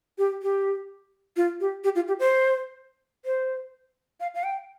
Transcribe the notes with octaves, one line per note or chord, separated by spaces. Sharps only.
G4
G4
F4
G4
G4
F4
G4
C5
C5
F5
F5
G5